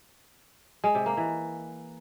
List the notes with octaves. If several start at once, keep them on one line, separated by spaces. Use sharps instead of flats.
G#3
C3
A#3
E3